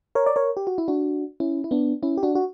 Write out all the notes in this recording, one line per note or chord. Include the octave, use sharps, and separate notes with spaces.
A#4 C#5
D5
A#4 C#5
G4
F#4
E4
D4 F#4
C#4 E4
E4
B3 D4
C#4 E4
G4
D4 F#4
F#4